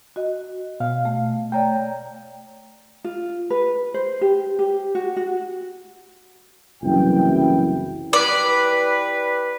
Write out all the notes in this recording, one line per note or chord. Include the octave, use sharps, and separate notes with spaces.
F#4 D#5
B2 F5
A3
A3 C#5 D5 G5 A#5
F4
B4
C5
G4
G4
F#4
F#4
F#1 C2 F#2 E3 E4 G5
G3 E4 B4 D5